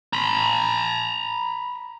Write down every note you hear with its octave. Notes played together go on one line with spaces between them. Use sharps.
A#5 B5